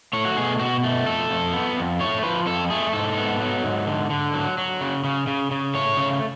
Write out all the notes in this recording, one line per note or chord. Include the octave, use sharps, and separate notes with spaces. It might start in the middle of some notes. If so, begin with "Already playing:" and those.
A3 C#5
F#4
B2 G#4
B2 F#4
A3
F2 A4
F2
B3
F2
A3 C#5
F3 B4
F2 A4
A3 G#4
G#2 A4
B3
F#3
G#2
D3
D3
F#3
F#3
C#3
C#3
C#3
C#3
A3 C#5
C#3